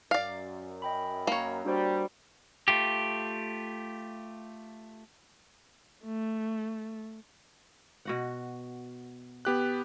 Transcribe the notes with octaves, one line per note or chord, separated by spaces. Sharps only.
F#2 D5 F5
D#5 G5 B5
A#3 C#5
G3 D4 F#4 C5
A3 F4 G4
A3
B2 F#4 F#5
B3 G4 F#6